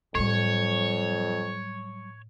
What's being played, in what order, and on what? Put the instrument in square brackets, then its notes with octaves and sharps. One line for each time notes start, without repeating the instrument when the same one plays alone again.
[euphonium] F2 [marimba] A2 [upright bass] F#3 G3 [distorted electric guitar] C#5